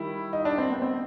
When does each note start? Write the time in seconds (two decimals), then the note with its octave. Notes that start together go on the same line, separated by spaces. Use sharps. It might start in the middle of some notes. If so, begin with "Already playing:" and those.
Already playing: D#3 G3 E4
0.33 D#4
0.45 D4
0.58 C4
0.70 B3
0.82 C4